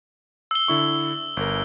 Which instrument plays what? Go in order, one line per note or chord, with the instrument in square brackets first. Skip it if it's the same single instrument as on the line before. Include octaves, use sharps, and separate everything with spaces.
[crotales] E6 G7
[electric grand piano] D3 E4 C#6
G1 A#4